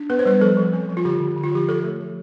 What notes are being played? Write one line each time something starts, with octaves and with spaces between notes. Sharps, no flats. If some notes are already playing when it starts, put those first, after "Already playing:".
Already playing: D4
B3 B4
C5
G3 B4
F3 A4
F3
C4
F3
F4
D3 G4
D3
D3
F4
F3 G4
F3 A4
A3
F3